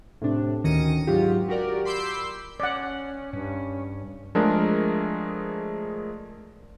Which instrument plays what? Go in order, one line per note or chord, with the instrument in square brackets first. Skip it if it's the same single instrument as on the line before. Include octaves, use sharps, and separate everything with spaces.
[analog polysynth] A2 C3 D4
D2 D#3 C#4 A#6 C#7 D#7
G#2 F#3 F4 G4
F#4 G4 A#4 D5
B5 C6 D6 E6 G6 C7
[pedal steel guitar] C#4 [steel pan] D5 F#5
[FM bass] G2 [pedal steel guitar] C#4
[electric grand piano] F3 G#3 A3 D4 G#4 A#4